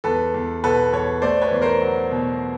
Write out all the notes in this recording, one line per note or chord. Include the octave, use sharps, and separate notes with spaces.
E2 A4 B4
E2
B2 A4 B4
E2 B4 C#5
A3 C5 D5
B4 C#5
E2
A#4 C5
F#3
B2